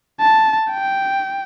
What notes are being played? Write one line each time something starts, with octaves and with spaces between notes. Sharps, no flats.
A5
G5